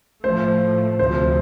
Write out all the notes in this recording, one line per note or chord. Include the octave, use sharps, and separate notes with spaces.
A2 F3 A3 C5
D2 C3 F3 C5